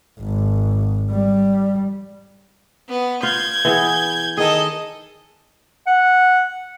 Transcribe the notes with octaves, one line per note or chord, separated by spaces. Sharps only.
G#1
G3
B3
F4 F5 G6 G#6
E3 B3 G#4
D#3 G#4 A4 D#5
F#5